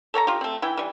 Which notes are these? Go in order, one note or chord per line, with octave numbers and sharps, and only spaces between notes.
A4 C#5 G#5 A#5
F4 G4
A3 C4
E3 E4 G5
E3 G3